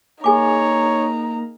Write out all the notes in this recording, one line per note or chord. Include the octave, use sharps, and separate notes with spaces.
A#3 D#4 G#4 C#5 G#5 A#5 D6